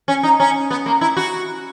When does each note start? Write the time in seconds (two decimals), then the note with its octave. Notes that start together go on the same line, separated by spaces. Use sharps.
0.08 C#4
0.23 D#4
0.40 C#4
0.71 B3
0.86 A#3
1.01 E4
1.17 F#4